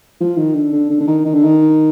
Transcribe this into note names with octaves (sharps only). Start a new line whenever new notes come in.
F3
D#3
D3
D3
D3
D3
D#3
D#3
D3
D#3